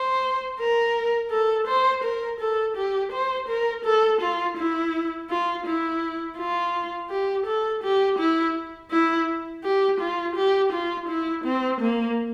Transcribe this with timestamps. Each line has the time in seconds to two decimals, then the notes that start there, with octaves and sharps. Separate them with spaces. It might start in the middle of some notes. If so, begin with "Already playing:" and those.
Already playing: C5
0.59 A#4
1.31 A4
1.68 C5
2.04 A#4
2.40 A4
2.77 G4
3.12 C5
3.48 A#4
3.85 A4
4.21 F4
4.57 E4
5.30 F4
5.66 E4
6.38 F4
7.10 G4
7.46 A4
7.84 G4
8.19 E4
8.91 E4
9.64 G4
10.00 F4
10.36 G4
10.73 F4
11.09 E4
11.44 C4
11.81 A#3